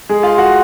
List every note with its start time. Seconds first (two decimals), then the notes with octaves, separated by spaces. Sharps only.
0.09 G#3 G#4
0.23 F4 F5
0.38 F#4 F#5